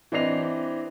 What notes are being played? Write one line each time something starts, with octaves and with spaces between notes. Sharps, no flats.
E3 C4 D4 D#5 C7 F7